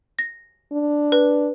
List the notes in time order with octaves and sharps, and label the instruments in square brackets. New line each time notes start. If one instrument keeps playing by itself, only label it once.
[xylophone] A#6
[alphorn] D4
[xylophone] B4